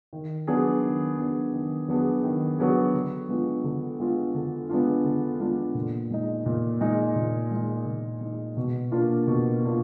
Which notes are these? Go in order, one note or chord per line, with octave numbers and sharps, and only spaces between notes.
D#3
F#3 B3 D4 G#4
D#3
F#3 B3 D4 G#4
D#3
F#3 B3 D4 G#4
D#3
F#3 B3 D4 G#4
D3
G#3 B3 D4 F4
D3
G#3 B3 D4 F4
D3
G#3 B3 D4 F4
D3
G#3 B3 D4 F4
A#2
G#3 D#4
A#2
G#3 D#4
A#2
G#3 D#4
A#2
G#3 D#4
B2
A#3 D4 F4
B2
A#3 D4 F4